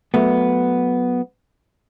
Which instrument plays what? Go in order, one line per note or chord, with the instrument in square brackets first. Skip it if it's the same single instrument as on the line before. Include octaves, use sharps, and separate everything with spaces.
[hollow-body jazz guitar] F#3 A3 B3